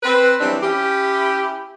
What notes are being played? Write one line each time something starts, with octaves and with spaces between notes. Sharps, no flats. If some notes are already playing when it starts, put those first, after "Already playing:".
C4 B4
E3 F#3 G3 C4 D4
C#4 E4 G4